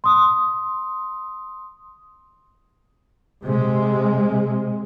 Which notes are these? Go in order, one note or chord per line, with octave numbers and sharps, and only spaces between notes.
C6 D#6
C3 G#3